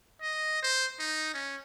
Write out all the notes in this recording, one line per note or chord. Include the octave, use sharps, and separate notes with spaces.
D#5
C5
D#4
C#4